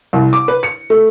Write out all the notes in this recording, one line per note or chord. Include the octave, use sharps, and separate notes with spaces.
C2
D6
B4
C#7
A3